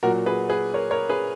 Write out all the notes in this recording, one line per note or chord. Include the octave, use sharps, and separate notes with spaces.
A#2 F#3 F#4 A#4
G#4 B4
G#4 B4
A#4 C#5
A#4 C#5
G#4 B4